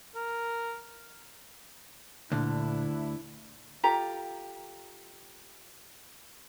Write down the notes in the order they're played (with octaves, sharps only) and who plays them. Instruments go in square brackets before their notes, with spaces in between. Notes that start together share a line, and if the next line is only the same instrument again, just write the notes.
[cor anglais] A#4
[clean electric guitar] D2 [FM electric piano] A#2 [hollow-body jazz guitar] D3 [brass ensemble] D4 E4
[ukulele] F4 G4 A4 A#5